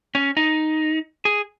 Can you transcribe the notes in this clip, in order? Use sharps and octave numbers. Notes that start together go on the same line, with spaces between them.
C#4
D#4
G#4